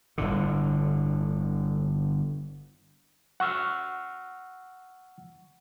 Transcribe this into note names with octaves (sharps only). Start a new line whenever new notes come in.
G1 A2 D3
F#5 C#6 E6 F6